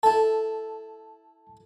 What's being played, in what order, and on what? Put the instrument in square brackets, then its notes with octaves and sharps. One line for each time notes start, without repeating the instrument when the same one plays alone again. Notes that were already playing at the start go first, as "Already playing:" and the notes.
[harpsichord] E4 A4 [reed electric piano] A5